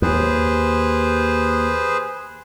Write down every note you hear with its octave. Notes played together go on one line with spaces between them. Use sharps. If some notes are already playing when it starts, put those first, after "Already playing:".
D#2 G#4 B4 C5